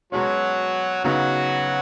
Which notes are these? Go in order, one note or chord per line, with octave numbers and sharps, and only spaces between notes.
B2 F#3 G#3 C#4 F#4
C#3 F#3 B3 D#4 F#4